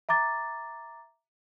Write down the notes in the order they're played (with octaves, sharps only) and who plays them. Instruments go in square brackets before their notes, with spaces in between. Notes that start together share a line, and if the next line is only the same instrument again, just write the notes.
[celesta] E5 A#5 D6 A6